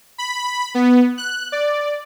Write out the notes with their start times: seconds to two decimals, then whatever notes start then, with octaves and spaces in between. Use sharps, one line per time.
0.18 B5
0.75 B3
1.18 F#6
1.52 D5